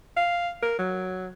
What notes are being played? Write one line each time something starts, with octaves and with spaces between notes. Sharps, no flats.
F5
A#4
F#3